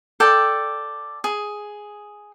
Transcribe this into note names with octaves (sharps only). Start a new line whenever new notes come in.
A4 D5 G5
G#4